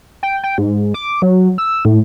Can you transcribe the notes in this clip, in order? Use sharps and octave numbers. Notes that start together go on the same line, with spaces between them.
G5
G5
G#2
D6
F#3
E6
A2